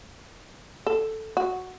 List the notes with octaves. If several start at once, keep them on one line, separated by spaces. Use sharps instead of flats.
A4
F#4